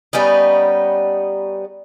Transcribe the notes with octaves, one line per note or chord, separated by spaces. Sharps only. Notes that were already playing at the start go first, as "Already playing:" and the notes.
G3 B3 C#4 D#4